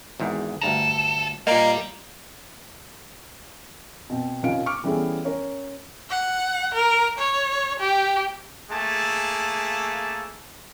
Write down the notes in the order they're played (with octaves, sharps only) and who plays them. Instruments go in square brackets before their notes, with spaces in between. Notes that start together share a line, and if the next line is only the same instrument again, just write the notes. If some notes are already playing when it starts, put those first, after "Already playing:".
[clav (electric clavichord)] G#1 E2 G#2
[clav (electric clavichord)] D2 G2 A#5 [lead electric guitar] A4
[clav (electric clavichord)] A#2 A#3 [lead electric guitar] G3 [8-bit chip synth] D#5 F5 A#5
[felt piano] B2 C4
C2 D#3 C#4 F4 F5 D7
C#6 D6 F6 D7
E3 G3 B3 C#4 G#4 A4
C#4 A#4 C#5
[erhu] F#5
A#4
C#5
G4
[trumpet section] A3 A#3 G#4 A5